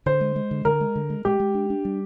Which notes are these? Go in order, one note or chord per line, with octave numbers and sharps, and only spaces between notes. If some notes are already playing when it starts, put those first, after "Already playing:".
D3 C5
G#3
G#3
D3
D3 A#4
G#3
D3
G#3
G#3 G4
G#3
D4
D4
G3